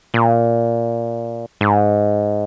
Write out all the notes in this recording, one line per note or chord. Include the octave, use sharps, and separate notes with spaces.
A#2
G#2